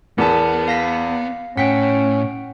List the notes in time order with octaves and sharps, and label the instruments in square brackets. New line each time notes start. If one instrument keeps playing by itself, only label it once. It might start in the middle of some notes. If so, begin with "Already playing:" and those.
[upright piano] E2 A5 [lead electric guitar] B3 [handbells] A#4
[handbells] F5 A#6 B6
[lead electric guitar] A2 [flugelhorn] C#4 [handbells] F#5 G5 D7 [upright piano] B6